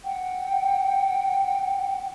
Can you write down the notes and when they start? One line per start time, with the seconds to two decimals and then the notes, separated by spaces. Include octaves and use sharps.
0.05 F#5 G5